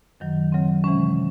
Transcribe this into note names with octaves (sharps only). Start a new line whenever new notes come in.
F#2 D#3 F#3
C#3 F#3 C4
C3 E3 G#3 C#4